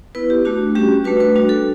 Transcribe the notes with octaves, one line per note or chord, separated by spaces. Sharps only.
B3 E4 B4
G4
A3 D4 F#4
G3 C#4 F#4 G4
A3 D4 F#4 B4
B4
G3 D4 F#4
A4